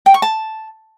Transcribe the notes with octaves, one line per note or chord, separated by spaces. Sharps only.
G5
C#6
A5